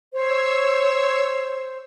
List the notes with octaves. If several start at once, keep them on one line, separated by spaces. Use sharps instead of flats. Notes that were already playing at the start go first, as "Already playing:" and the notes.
C5 C#5 E6